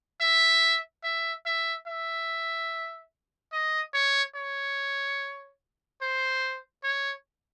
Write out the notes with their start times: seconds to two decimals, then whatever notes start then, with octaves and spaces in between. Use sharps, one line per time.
0.21 E5
1.04 E5
1.46 E5
1.87 E5
3.52 D#5
3.94 C#5
4.35 C#5
6.02 C5
6.84 C#5